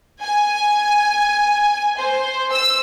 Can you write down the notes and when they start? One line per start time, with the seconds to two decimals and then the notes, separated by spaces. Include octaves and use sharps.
0.22 G#5
1.97 C5
2.52 E6